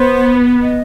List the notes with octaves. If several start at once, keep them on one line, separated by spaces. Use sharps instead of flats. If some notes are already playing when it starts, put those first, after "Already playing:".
Already playing: B3 C5
D#5